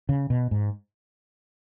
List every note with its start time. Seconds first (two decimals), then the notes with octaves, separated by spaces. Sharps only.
0.09 C#3
0.30 B2
0.51 G#2